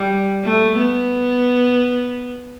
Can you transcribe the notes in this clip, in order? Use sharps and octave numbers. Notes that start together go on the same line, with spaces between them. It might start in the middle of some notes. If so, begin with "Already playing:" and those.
Already playing: G3
A3
B3